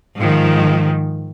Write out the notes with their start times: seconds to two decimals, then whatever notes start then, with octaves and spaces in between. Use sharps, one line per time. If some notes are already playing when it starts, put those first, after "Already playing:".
0.19 G#2 D#3 F3